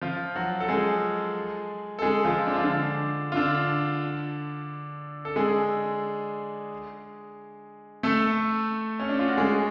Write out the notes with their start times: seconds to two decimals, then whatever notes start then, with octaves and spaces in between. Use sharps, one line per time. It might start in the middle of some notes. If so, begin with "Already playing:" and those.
0.02 F3 F4
0.36 F#3 F#4
0.60 A4
0.69 G#3 G#4
1.99 A4
2.02 G#3 G#4
2.24 F3 F4
2.47 D4
2.55 F4
2.64 D3 D4
3.32 F4
3.36 D3 D4
5.25 A4
5.36 G#3 G#4
8.03 A3 A4
8.99 C#4
9.09 D4
9.19 F4
9.28 F#4
9.37 G#3 G#4